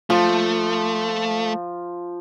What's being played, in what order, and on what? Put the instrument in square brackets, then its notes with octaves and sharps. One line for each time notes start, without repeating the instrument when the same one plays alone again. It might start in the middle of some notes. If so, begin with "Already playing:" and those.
[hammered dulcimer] F3 [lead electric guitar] A3